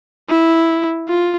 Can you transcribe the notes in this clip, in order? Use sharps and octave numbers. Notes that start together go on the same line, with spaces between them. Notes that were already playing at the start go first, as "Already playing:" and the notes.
E4
F4